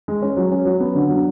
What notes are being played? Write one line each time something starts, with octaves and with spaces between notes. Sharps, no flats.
G#3
C#4
F#3
C#4
F#3
B3
D3
F#3